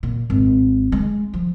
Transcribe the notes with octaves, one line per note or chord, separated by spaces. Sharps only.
A#2
G#1
G#3
F3